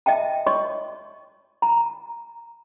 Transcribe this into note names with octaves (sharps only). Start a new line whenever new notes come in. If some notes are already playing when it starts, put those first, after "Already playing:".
D#5 E5 G5 A5
C#5 D#5 C6 C#6
A#5